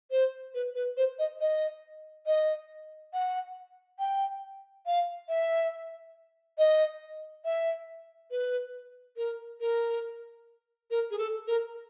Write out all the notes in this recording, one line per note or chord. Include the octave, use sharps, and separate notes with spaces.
C5
B4
B4
C5
D#5
D#5
D#5
F#5
G5
F5
E5
D#5
E5
B4
A#4
A#4
A#4
G#4
A4
A#4